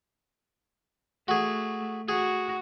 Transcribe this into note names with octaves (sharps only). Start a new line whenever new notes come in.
A3 F#4 G#4
F#4 G#4